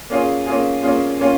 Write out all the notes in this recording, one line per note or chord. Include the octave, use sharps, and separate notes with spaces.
A#3 C#4 F4 G#4
A#3 C#4 F4 G#4
A#3 C#4 F4 G#4
A#3 C#4 F4